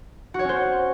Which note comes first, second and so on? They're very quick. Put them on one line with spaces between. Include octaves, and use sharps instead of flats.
F#4 C#5 C#4 C5